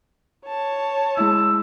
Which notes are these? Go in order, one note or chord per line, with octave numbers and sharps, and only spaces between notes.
C#5 A5
G#3 E4 E6